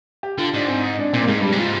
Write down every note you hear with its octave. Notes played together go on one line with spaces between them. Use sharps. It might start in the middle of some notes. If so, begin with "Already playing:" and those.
G4
D3 F4
G#2 D4
C4
D#4
D4
A#2 C4
A#3
G#2 G#3
G2 G3
G#2
F4